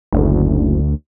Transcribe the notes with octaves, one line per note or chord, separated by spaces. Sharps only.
F#1 D2